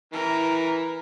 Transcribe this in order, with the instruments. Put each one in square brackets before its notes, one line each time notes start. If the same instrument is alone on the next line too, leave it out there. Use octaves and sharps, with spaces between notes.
[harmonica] E3 [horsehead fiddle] A#4